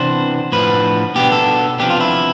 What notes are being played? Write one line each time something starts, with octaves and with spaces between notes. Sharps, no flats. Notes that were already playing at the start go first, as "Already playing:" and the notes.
Already playing: C3 E3 B3 D4 C5
A2 F3 B3 D4 B4
B2 B3 D4 G4
A4
C3 F3 B3 D4 G4
F4
E4